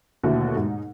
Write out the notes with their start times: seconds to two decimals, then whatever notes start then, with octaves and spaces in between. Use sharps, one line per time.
0.23 D#2 B2 D3 A3 E4 F#4
0.56 G#2 D#4